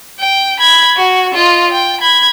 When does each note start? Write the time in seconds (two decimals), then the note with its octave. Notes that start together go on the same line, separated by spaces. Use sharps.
0.20 G5
0.60 B5 G#6
0.97 F#4
1.34 F4 D#5
1.71 G5
2.01 B5 G#6